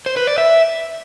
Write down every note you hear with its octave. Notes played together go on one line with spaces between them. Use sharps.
C5
B4
D5
E5